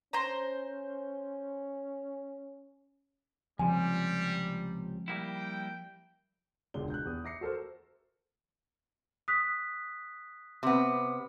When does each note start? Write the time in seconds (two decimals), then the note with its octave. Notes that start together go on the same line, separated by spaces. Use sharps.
0.13 C#4 C5 A#5
3.59 C#2 C3 F3 G3 G#5
5.08 G3 A#3 E4 G5
6.74 E1 C#2 D3 D4 G#4 G7
6.90 F#6 G6
7.05 E2 G4 D#6
7.24 E5 D6 A#6 C7 C#7
7.41 F#4 A4 A#4 C5
9.28 D#6 F#6 B6
10.63 C3 B3